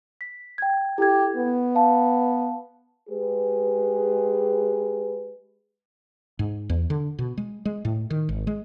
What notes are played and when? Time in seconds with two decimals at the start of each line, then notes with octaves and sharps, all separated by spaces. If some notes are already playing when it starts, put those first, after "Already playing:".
0.21 B6
0.58 G5 G#6
0.98 E4 G4 A4 G#6
1.36 B3
1.75 F5 A5
3.10 G#3 G4 G#4 B4
6.39 G#2
6.69 E2
6.90 D3
7.19 B2
7.38 G#3
7.65 G#3
7.85 A2
8.10 D#3
8.29 G#1
8.47 G#3